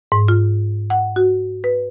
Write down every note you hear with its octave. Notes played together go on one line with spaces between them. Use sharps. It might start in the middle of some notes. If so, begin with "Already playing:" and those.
G#2
F4
F#5
F#4
B4